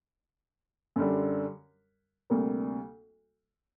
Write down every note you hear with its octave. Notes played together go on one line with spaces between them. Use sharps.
F#2 D3 G3
D2 C3 G3 A#3